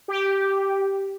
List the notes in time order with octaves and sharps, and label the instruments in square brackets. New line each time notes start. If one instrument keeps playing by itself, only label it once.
[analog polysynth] G4